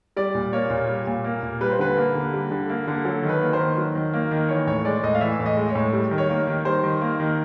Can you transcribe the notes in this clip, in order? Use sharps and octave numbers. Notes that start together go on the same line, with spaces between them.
G3 D5
A#2
A#3 C#5
A#2
G3
A#2
A#3
A#2
G3 B4
C5
D3 B4
A#3
D3
G3
D3
A#3
D3
F#3 A4
D#3
B4
A#3
C5
D#3
F#3
D#3
A#3
D#3
E3 C#5
A2 C#5
G#3 D5
A2 D#5
F5
E3 E5
A2
D#5
G#3
C#5
A2
G3
D#3
C#5
A#3
D#3
G3 C5
D#3
A#3
D#3